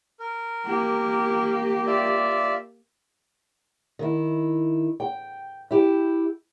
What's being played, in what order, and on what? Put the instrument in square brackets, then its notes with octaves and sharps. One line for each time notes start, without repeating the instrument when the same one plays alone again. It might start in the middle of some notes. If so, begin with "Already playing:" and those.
[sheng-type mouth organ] A#4
[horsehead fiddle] A#3 G4
[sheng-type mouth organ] F4 D5 E5
[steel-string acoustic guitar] D#3 E4
G5
E4 G4